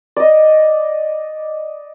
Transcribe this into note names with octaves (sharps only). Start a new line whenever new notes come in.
D5 D#5